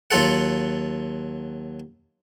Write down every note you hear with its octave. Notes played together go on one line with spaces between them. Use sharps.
D#2 F#3 F4 A4 F#5